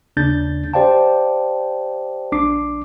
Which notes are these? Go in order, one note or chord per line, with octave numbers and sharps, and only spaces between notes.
D#2 C#3 D4 G6 A6
G4 C5 D5 F5 G5 A5
A#1 D4 D6 C7